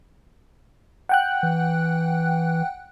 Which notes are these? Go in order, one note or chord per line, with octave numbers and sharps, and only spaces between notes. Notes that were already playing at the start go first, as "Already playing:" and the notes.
F#5 G5 F#6
E3